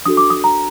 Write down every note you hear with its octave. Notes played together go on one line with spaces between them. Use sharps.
D4 F#4 A4 D#6
D6
D#6
A#5